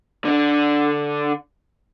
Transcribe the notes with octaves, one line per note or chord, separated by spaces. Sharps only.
D3 D4